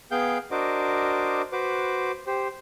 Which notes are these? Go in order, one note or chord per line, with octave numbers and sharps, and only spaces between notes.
B3 G#4 F5 G5 G6
D4 F#4 A#4 C5 D#5 D6
F#4 B4 C5 D6
G4 C5